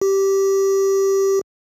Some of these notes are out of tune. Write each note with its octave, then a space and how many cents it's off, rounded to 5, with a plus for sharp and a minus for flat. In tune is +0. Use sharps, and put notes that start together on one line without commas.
G4 -10